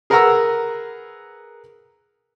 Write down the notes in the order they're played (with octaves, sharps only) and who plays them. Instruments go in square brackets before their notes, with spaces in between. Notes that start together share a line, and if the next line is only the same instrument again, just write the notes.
[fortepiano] G#4 A#4 B4 F#5 A#5 E6